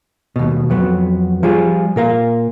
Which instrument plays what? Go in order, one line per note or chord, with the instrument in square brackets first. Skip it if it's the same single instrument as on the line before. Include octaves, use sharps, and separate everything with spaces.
[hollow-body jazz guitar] D#2 B2
F2 F#3 B3
F3 G3 F4 G#4
A#2 A#4 F5